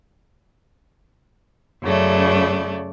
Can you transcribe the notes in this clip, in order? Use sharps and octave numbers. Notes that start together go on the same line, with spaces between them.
F#2 C#3 A3 D5